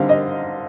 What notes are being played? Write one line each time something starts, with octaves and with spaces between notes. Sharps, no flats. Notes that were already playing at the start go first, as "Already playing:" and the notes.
Already playing: D3 G3 C4 D#4 F5
D#5